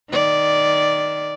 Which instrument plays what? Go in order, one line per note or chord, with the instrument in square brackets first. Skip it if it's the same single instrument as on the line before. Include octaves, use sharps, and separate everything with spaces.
[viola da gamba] D#3 D5